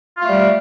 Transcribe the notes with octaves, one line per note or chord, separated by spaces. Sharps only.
G3 A3 F4